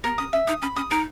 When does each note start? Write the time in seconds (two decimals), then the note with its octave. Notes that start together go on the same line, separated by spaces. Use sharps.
0.04 B3 A#4
0.18 C#4 D#6
0.33 C#4 E5
0.47 D#4 D#6
0.62 C#4 B5
0.76 C#4 D#6
0.90 D#4 A#4